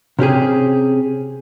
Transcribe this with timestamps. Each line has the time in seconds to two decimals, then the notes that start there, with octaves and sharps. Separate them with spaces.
0.19 C3 C#4 G4 G#4